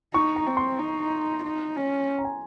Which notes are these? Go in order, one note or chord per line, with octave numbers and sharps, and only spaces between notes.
D#4 C#6
A#5
C4
C6
D#4
D#4
C#4
A#5
G#5